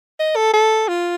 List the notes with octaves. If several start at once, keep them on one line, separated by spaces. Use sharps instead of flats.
D#5
A4
A4
F4